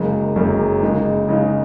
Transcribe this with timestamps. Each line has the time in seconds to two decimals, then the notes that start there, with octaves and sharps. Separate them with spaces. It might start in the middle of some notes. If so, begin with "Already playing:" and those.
Already playing: F#1 F#2 C#3 G#3
0.35 F#1 F#2 C#3 G#3
0.82 C#3 G#3 D#4
1.28 C#3 G#3 D#4